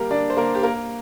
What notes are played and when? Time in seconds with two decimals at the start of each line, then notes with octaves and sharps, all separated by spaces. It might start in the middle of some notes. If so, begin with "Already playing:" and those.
Already playing: G3 A#3 G4 A#4
0.11 D4 D5
0.30 C5
0.37 A#3 A#4
0.55 G4
0.63 A#3 A#4